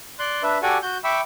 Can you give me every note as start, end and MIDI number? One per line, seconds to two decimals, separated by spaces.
0.19 0.42 74
0.19 0.42 84
0.19 0.42 90
0.43 0.58 62
0.43 0.58 71
0.43 0.58 76
0.63 0.78 66
0.63 0.78 67
0.63 0.78 69
0.63 0.78 74
0.63 0.78 78
0.63 0.78 80
0.82 0.98 66
0.82 0.98 91
1.04 1.21 76
1.04 1.21 79
1.04 1.21 83
1.04 1.21 85
1.04 1.21 86
1.04 1.21 88